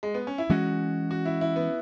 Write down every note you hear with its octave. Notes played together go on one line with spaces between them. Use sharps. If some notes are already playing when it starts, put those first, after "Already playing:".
G#3
B3
C#4
E4
E3 G#3 C#4 F#4
F#4
E4
E4
B3